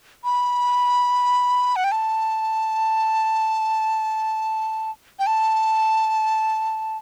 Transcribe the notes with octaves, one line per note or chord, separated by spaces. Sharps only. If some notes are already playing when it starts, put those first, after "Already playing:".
B5
F#5
G5
A5
G5
A5